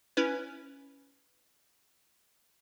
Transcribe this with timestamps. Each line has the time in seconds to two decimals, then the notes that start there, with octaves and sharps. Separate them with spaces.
0.17 C#4 E4 B4